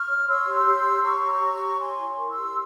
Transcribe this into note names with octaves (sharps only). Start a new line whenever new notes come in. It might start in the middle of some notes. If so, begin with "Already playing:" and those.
Already playing: C#6 F6
C#5
C#5 C6 E6
G4
G4
C#5
C#5 A#5 C#6
G4
G4
C#5
C#5 G#5 C6
E4
A#4
C6 E6
G4